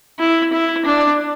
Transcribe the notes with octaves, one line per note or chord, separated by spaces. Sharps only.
E4
E4
D4